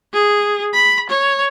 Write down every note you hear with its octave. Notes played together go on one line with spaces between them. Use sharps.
G#4
B5
C#5